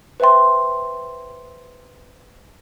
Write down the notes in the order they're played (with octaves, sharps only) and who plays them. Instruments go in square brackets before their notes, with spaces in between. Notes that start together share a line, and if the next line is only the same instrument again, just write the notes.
[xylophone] B4 C5 E5 G5 C6